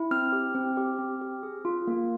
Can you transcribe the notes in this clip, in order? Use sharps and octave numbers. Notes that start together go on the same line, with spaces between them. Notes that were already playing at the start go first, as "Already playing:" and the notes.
Already playing: E4
C4 F6
G4
C4
G4
C4
G4
G#4
F4
A#3